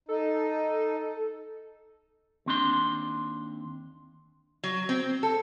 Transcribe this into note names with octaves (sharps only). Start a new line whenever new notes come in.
D#4 A4
D#2 C4 D4 C6
F#3
C4
A4